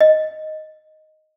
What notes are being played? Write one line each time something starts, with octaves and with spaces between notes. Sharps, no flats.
D#5